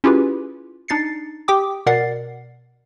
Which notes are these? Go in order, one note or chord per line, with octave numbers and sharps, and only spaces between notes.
C#4 E4 F4 G4 G#4 B4
D4 D#4 A6 C7 C#7
G4 G5 D6 D#6
B2 A#4 D5 F#5 A6 C7